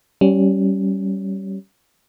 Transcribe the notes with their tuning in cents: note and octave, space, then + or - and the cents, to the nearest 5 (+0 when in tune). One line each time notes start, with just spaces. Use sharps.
G3 -20 C#4 +0